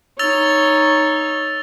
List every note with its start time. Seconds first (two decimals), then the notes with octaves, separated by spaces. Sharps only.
0.19 D#4 C#5 E6 A6 F7